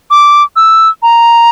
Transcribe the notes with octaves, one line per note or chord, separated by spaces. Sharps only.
D6
E6
A#5